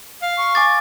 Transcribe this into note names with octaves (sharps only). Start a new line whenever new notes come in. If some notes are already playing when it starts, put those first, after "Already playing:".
F5
C#6
G#5 D6 A6